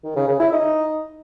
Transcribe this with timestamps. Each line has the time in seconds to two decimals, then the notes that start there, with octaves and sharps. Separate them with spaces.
0.04 D#3
0.16 C#3
0.28 C#3
0.40 E4
0.52 D#4